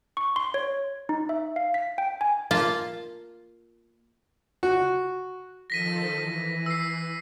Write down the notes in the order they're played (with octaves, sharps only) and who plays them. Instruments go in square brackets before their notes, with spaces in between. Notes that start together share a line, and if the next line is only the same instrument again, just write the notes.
[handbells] C#6
C6
C#5
D#4
E5
F5
B6
G5
G#5
[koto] A#3 F4 A5
[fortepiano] F#4
[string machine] D#3 F3 A4 [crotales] A#6 B6 D#7
[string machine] E3
[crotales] E6 C7